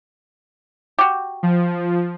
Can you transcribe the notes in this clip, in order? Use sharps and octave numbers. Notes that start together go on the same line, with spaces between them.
F#4 G4
F3